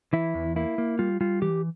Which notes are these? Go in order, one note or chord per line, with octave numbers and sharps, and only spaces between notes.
E3 E4
E2
A#3 E4
A#3
G3 F4
G3 F4
E3 G4